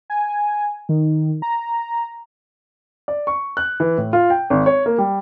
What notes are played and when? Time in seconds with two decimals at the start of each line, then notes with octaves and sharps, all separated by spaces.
0.10 G#5
0.89 D#3
1.42 A#5
3.08 D5
3.27 C#6
3.57 F#6
3.80 E3
3.98 A2
4.13 F4
4.30 G5
4.50 G#1
4.66 C#5
4.86 A#3
4.98 G3